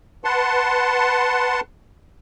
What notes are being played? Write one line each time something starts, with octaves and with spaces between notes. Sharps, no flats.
B4 F#5 A5 C6